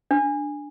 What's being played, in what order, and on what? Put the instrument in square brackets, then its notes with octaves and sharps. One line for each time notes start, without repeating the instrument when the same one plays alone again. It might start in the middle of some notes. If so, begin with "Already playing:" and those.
[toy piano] D4